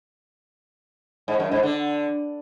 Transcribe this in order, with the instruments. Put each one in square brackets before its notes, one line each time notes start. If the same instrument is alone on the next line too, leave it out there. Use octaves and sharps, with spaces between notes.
[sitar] G#2
F#2
G#2
D3